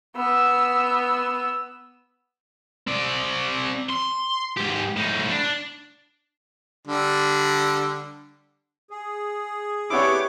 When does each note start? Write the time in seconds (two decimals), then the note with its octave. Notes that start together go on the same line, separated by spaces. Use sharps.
0.16 B3 E6
2.88 C4 D5
3.89 C6
4.57 G#2 G4
4.97 A2 D#4
5.31 D4
6.87 D3 G3
8.91 G#4
9.90 B3 D4 E4 G4 C#5 D6